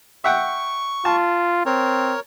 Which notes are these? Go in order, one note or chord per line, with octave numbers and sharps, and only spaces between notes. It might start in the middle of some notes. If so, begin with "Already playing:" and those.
E5 F#5 G5 C#6
F4 A5
C4 A#4 C#5